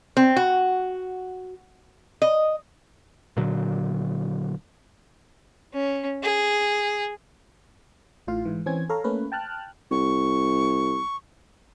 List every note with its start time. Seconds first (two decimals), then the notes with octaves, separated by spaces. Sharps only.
0.17 C4
0.37 F#4
2.22 D#5
3.37 A#2 D3 F#3
5.74 C#4
6.23 G#4
8.27 A1 A2 F4 F5
8.45 G#2 E3
8.66 E3 C4 C#4 G#5 G#6
8.89 A4 C#5 F5 A#5
9.04 A3 A#3 C#4 B4
9.32 G5 A5 F6 F#6
9.91 C2 C#6